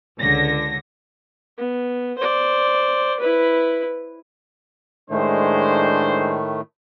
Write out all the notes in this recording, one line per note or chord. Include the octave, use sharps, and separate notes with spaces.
C#2 D3 A#6
B3
C5 D5
E4 B4
A2 D#3 G#3 A3 D4 C5